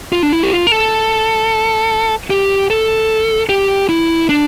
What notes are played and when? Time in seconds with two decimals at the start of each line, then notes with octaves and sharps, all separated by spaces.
0.12 F4
0.23 D4
0.33 E4
0.43 G4
0.53 F4
0.67 A#4
0.72 A4
2.30 G4
2.70 A4
3.49 G4
3.89 E4
4.29 D4